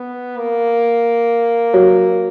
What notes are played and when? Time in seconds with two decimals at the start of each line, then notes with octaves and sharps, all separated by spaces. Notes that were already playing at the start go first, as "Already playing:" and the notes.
Already playing: B3
0.38 A#3
1.74 F#3